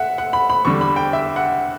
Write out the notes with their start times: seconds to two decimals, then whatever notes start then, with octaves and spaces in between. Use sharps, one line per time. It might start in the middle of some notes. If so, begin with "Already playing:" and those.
Already playing: E5 F#5
0.18 F#5
0.33 B5
0.50 B5
0.65 E2 D3 G3 C#6
0.81 B5
0.96 G5
1.13 E5
1.36 F#5